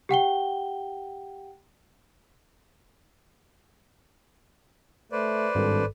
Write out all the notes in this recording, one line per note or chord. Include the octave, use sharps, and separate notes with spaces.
G4 F#5 G5 G7
A3 B4 C5 D5
G#1 G2 A4